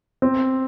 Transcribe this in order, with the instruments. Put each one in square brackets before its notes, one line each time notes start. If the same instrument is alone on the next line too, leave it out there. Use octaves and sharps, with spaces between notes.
[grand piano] C4